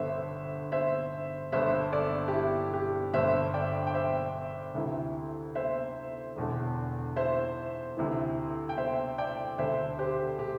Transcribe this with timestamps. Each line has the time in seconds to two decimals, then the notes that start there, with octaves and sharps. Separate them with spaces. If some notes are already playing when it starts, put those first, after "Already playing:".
Already playing: G1 G2 D3 C5 E5
0.72 C5 E5
1.52 G1 G2 D3 C5 E5
1.92 A4 D5
2.28 G4
2.33 E4
2.73 G4
3.14 G1 G2 D3 C5 E5
3.54 D5 G5
3.87 G5
3.94 C5 E5
4.75 D2 C3 E3
5.55 C5 E5
6.36 E1 E2 D3
7.16 C5 E5
7.97 D2 C3 E3
8.69 G5
8.77 C5 E5
9.18 D5 G5
9.58 D2 D3 C5 E5
9.99 G4 C5
10.39 G4